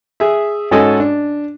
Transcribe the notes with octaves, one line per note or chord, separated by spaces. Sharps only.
G#4 E5
G#2 C#4 F#4 A4 D#5 G#5
D4